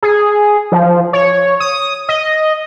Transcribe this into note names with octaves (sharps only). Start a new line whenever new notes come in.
G#4
F3
C#5
D#6
D#5